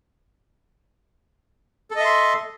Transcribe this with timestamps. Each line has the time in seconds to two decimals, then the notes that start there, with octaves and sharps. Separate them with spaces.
1.91 A4
1.96 D#5
2.00 E5
2.05 C6